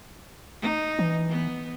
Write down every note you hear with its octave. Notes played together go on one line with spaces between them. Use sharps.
D#4
E3
B3